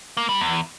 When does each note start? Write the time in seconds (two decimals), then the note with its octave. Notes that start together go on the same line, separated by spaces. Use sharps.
0.17 A#3
0.29 G3
0.41 E2